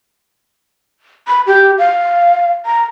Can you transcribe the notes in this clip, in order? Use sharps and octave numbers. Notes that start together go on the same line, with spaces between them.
B5
G4
F5
A#5